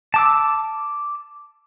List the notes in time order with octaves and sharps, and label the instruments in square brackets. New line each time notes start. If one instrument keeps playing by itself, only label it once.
[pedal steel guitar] A5 D6 E6